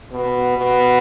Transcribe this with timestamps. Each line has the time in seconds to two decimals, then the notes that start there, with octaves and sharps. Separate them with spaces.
0.12 B2
0.58 B2